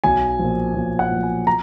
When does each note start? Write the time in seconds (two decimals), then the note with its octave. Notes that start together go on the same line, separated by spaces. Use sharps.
0.04 B1 G#5
0.39 A#2 F3
0.75 B1
0.99 F#5
1.11 A#2
1.16 F3
1.23 G#5
1.47 A#5